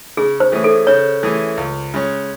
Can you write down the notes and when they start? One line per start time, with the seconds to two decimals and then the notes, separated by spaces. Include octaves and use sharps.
0.17 C#3 G#4
0.40 C5
0.52 E3 A3 C#4 G#4
0.64 A4
0.87 C#3 C#5
1.23 E3 A3 C#4 G#4
1.57 C#2
1.94 C#3 G#3 C#4